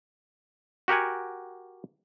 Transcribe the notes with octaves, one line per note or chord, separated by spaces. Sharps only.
F#4 G4 A#4 F#5 G#5